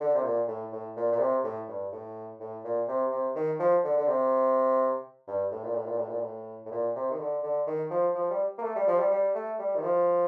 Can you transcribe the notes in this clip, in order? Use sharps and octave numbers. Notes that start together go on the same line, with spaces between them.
D3
C3
A#2
A2
A2
A#2
A#2
C3
A2
G2
A2
A2
A#2
C3
C3
D#3
F3
D3
D3
C3
G2
A2
A#2
A2
A#2
A2
A#2
A2
A2
A#2
C3
D#3
D3
D3
D#3
F3
F3
G3
A#3
A3
G3
F3
G3
G3
A3
G3
D#3
F3